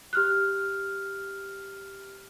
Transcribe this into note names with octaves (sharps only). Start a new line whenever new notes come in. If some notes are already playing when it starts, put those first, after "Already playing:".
G4 F6 F#6